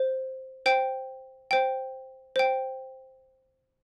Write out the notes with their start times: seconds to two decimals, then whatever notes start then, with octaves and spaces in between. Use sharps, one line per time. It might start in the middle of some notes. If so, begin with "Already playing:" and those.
Already playing: C5
0.66 C5 G5
1.51 C5 G5
2.36 C5 G5